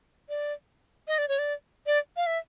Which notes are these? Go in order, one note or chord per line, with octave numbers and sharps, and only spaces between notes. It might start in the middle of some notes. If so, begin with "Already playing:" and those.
D5
D#5
D5
C#5
D5
D5
F5
E5